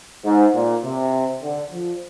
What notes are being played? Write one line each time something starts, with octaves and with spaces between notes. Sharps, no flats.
G#2
A#2
C3
D3
F3